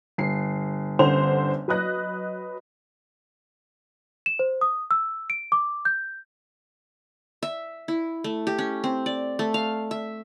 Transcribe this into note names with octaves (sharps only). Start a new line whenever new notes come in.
G1 C7
G1 D3 C#4 C5 F#5 F7
F#3 B4 D#5 F#6 A#6
E7
C5
D#6
E6
D7
D6
G6
E5
E4
A3
G4
C#4
C4
D5
A3
F5
E5